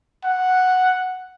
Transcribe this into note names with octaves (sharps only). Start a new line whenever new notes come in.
F#5